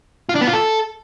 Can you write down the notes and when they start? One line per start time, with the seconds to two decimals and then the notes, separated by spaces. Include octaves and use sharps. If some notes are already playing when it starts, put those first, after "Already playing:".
0.29 F4
0.35 D4
0.41 B3
0.47 F4
0.53 A4